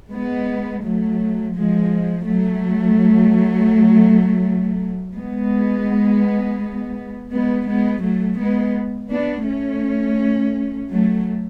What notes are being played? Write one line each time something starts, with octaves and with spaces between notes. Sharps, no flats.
G#3 B3
F#3 A3
F3 G#3
F#3 A3
G#3 B3
G#3 B3
G#3 B3
F#3 A3
G#3 B3
B3 D4
A3 C#4
F#3 A3